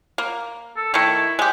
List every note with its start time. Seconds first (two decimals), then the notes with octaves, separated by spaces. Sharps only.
0.18 A#3
0.77 A4
0.94 D#3 A3 E4
1.39 G#3 G4